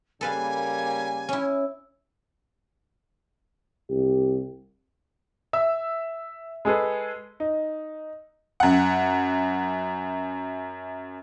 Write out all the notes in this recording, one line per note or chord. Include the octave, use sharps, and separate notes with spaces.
C#3 G3 A#3 A4 B4 F5 G#5
C#4 E4
C2 G4
E5 E6
G#3 G#4 A4 B4
D#4
F#2 F#5